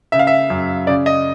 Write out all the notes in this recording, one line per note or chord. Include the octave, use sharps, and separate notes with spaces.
C#3 E5
F5
E5
F#2
C#3 D5
D#5